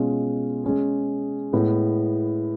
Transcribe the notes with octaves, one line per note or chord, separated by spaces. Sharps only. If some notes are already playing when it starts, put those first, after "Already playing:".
Already playing: B2 G#3 C#4 F4
G#3 C#4 G#4
A2 G#3 B3